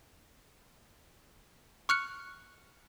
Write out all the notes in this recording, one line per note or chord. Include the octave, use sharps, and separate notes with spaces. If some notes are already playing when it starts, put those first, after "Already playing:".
C#6 F6 F#6 C#7